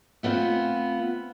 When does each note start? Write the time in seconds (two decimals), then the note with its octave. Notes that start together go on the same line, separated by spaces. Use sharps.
0.23 A3 B3 C4 F4